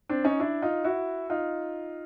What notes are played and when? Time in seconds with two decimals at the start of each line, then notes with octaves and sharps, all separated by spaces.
0.09 C4 D4
0.24 C#4 D#4
0.40 D4 E4
0.62 D#4 F4
0.84 E4 F#4
1.30 D#4 F4